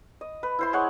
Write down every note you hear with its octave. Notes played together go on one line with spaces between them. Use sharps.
D#5
B4
E4 C5 C6
G#3 C#5 F#5